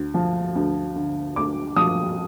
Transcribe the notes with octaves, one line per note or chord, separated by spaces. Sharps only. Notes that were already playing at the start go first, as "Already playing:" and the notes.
Already playing: D2
F3
D2
D3
D2 D6
F3 D#6